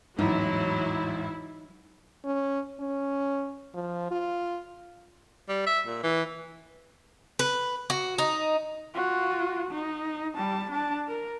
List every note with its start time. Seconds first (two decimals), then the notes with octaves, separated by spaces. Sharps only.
0.19 A1 E2 G#2 F#3 D#4 E4
2.25 C#4
2.80 C#4
3.74 F3
4.11 F4
5.49 G3
5.67 E5
5.87 A#2
6.03 E3
7.39 B4
7.90 F#4
8.18 D#4
8.95 F4 F#4
9.71 D#4
10.35 G3 A5
10.71 D4 A5
11.08 A#4